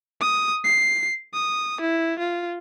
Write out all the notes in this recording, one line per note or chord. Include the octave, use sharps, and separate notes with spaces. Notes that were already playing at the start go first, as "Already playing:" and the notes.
D#6
C7
D#6
E4
F4